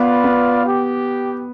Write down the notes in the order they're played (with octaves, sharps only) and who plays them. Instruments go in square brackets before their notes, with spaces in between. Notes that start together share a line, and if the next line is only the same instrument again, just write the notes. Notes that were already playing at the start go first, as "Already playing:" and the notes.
Already playing: [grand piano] B3 [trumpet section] F4 B4 D5 F5
[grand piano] B3
[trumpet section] G4